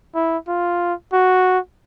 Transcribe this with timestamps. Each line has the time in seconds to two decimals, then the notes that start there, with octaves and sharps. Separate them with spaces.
0.15 E4
0.48 F4
1.13 F#4